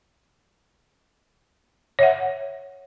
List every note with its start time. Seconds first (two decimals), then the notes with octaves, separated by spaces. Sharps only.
1.99 C#5 E5 F#5